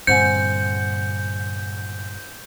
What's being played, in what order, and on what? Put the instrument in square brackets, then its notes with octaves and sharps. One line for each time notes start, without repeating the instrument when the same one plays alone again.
[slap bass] G2 A#2 D3 [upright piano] C4 F#5 G#5 [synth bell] G6 [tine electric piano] C#7